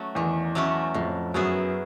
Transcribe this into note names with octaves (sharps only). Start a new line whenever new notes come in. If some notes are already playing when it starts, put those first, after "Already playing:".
Already playing: F#3 A3 C#4
E2 D#3
F#3 A3 C#4 E4
F2 A2
F#2 F#3 B3 E4 G#4